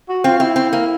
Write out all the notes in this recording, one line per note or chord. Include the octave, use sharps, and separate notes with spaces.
F#4
C4 F4
C4 E4
C4
A#3